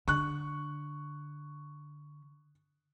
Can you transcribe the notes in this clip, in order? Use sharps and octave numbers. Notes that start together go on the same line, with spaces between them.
D3 C#6 F#6